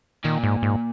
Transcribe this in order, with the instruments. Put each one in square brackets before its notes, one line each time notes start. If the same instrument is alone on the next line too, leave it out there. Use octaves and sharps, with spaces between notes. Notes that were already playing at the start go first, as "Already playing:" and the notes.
[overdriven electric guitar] A#2 [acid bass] D#3
[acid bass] G#2
G#2